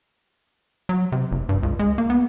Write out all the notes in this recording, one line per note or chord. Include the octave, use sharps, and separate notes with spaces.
F#3
C3
F#1
G2
C#2
G#3
A#3
B3